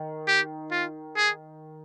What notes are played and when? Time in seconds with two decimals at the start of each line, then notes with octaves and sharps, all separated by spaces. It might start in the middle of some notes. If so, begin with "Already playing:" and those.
Already playing: D#3
0.28 G4
0.71 F4
1.16 G#4